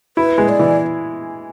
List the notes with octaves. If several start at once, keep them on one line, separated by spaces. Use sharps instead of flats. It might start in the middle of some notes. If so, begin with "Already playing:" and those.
E4 B4
G#3
D5
E3